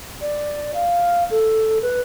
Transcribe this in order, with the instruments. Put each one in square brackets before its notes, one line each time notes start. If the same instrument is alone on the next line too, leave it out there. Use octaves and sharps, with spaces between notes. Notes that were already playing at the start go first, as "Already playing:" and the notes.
[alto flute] D5
F5
A4
B4